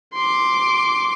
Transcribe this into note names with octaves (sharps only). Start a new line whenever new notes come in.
C6 D6